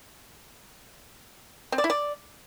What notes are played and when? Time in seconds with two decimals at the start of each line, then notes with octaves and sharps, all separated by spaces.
1.72 C4
1.78 D5
1.84 E4
1.90 D5